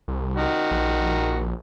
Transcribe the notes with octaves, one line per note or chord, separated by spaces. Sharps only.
C2
D#3 F#4
A#1